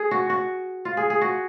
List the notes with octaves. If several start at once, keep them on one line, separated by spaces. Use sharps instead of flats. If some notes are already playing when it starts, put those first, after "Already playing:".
Already playing: G#4
F#4
F#4
F4
G#4
G#4
F#4